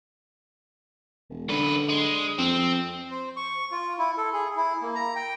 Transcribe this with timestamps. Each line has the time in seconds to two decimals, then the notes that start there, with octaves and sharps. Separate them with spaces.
1.30 E1
1.49 F#2 D3 B4
1.89 G#3
2.39 F2 C4
3.11 C5
3.36 C#6
3.72 F4
3.99 E4
4.18 A4
4.33 G#4
4.57 E4
4.82 A#3
4.95 A#5
5.16 G5